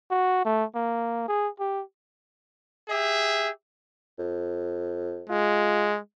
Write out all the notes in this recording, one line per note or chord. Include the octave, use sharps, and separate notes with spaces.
F#4
A3
A#3
G#4
G4
G4 G#4 E5
F2
G#3 F4